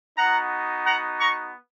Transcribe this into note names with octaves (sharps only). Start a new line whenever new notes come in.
B3 D#4 F#4 F#5 A#5
F#5 A#5
A#5 C#6